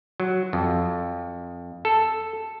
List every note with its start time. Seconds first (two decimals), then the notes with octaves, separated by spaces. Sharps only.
0.20 F#3
0.53 F2
1.85 A4